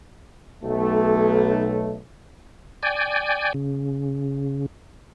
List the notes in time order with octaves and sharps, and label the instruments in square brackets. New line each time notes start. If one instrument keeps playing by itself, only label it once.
[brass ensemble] B1 A3
[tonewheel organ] D5 G5 G#5
C#3